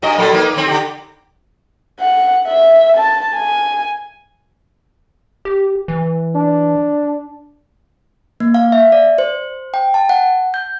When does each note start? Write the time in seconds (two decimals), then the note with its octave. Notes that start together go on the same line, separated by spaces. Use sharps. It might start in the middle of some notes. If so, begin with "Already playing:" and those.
0.02 G2 F#4 D#5
0.18 A#2 F#3 A4
0.33 A#3 D#4 B4
0.54 D#3 C4
0.66 D3 G4
2.00 F#5
2.48 E5
2.97 A5
3.35 G#5
5.45 G4
5.88 E3
6.35 D4
8.40 A#3
8.54 F5
8.72 E5
8.92 D5
9.18 C5
9.74 G5
9.94 A5
10.09 F#5
10.54 G6